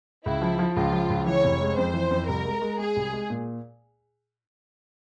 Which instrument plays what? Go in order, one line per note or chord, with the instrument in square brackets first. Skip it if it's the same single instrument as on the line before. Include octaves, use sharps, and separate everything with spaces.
[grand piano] C#2 [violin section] E4
[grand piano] F3
F3
[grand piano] C#2 [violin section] F4
[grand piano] F3
C#2
[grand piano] E3 [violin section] C#5
[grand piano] F1
G#3
[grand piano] F2 [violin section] C5
[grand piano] E3
F2
[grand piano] C2 [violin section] A#4
[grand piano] G#3
G#3
[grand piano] G#3 [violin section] G#4
[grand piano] C2
G#3
A#2